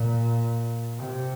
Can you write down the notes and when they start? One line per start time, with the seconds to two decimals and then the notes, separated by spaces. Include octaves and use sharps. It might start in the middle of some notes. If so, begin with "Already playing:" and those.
Already playing: A#2
0.97 C3